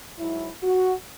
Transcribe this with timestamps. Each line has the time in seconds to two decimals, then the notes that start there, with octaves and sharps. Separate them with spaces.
0.18 G#2 F#3 E4
0.62 F#4